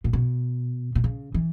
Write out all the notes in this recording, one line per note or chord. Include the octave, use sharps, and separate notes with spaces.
A#2
B2
B2
C#3
E3